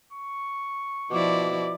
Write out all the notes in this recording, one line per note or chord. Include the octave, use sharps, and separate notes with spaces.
C#6
B2 F3 E4 D5 D6